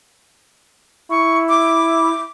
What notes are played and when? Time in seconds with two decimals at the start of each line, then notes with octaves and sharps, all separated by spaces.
1.11 E4 C#6
1.49 D6